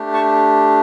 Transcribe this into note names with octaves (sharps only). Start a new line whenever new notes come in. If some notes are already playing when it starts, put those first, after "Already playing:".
Already playing: A3 D4 G4
A5 C#6